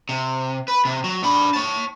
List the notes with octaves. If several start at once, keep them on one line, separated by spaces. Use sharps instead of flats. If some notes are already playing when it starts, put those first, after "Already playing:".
C3
B4
C3
F#3
D4 B5
C#5 A5